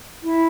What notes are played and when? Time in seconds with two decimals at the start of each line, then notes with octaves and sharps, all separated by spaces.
0.23 E4